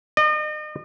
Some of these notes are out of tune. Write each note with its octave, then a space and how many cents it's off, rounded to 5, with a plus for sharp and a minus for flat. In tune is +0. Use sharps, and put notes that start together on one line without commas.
D#5 -40